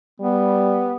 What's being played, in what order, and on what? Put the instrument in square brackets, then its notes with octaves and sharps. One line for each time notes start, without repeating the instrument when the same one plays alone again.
[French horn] G3 [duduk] B3